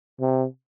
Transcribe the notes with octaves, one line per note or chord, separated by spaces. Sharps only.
C3